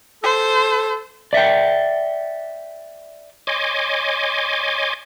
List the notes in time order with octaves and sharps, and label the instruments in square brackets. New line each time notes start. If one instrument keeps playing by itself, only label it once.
[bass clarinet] A4 [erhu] C5
[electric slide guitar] D5 E5 F#5 G5
[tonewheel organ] C#5 D#5 G#5 C6 D6